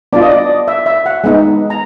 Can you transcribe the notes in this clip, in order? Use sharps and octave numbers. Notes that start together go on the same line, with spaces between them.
B3 D4 F4 D5
D#5
D5
E5
E5
F#5
G#3 B3 D#4
A#5